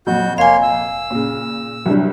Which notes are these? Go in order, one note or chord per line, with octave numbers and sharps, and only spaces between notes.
F2 A#2 F#3 F#4 G6
F1 A#3 C#5 F5 G#5 C6
E6
A#2 C#3
C2 G2 F#3 G3